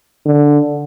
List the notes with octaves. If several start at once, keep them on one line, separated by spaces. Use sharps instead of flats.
D3